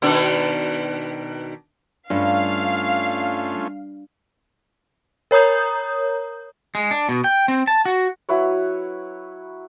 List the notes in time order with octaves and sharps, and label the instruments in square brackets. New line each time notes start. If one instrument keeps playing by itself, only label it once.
[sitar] B2 D#3 D4
[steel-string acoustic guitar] G2 [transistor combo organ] A3 C#4 F4 [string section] F5
[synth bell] A#4 C#5 A#5 D#6 G6
[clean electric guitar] G#3
D4
B2
G5
C4
A5
F#4
[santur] F#3 E4 B4 C#5